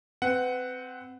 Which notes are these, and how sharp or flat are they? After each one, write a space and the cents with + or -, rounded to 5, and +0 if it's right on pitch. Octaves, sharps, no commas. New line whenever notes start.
C4 -10 B4 +30 F#5 +0